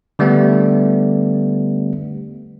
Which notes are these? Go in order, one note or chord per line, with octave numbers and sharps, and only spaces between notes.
D3 G3 A3 B3